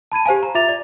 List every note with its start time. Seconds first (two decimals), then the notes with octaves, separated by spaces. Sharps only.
0.12 A5 B5 G#6 D#7
0.26 G4 C5 F5 G#5
0.43 A#5
0.55 F4 E5 D6 A6 F7
0.69 D5